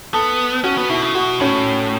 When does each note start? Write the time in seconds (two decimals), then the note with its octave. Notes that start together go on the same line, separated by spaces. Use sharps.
0.13 B3 A4
0.64 C#4 F#4
0.77 B3
0.89 B2 E4
1.02 C#3
1.14 B2 F#4
1.40 A2 C#4